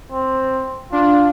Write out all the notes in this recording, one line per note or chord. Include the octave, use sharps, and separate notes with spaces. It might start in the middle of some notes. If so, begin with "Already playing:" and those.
C4
D4 F4